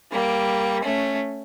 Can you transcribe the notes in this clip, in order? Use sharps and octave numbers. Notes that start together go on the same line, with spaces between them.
G3 A#3
A3 C#4